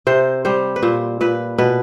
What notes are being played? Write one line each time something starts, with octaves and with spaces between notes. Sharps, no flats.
C3 C5
G3 C5
B4
A#2 C5
A#2 B4
B2 B4